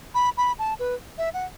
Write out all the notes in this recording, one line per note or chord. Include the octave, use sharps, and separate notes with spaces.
B5
B5
A5
B4
E5
F#5